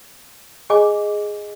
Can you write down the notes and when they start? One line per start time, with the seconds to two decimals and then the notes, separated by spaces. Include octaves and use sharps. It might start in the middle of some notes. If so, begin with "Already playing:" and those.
0.70 G#4 D#5 G#5 D6